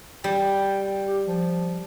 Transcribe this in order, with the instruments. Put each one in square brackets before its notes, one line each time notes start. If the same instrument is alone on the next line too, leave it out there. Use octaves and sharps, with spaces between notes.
[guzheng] G3 [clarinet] G5
[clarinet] G4
F3